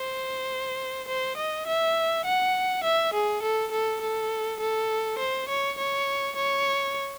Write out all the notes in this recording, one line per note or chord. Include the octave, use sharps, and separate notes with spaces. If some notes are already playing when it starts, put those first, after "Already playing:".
Already playing: C5
C5
D#5
E5
F#5
E5
G#4
A4
A4
A4
A4
C5
C#5
C#5
C#5